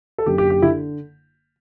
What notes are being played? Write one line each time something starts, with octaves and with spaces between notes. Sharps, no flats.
A4
F#1 F#2 D3 G4
G4
G4
D3 E4